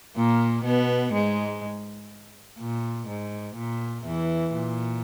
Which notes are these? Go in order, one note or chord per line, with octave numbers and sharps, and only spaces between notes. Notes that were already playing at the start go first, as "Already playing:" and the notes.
A#2 A#3
B2 B3
G#2 G#3
A#2
G#2
A#2
E2 E3
A#2